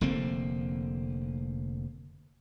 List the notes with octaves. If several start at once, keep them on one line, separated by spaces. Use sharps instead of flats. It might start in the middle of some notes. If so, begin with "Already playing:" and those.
F1 D3 A#3 C4